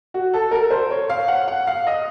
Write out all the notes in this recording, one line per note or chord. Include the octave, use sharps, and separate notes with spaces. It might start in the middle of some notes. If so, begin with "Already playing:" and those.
F#4
A4
A#4
C5
C#5
F5
F#5
F#5
F5
D#5